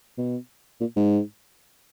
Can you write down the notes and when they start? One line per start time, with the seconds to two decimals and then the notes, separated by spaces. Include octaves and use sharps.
0.18 B2
0.80 A#2
0.97 G#2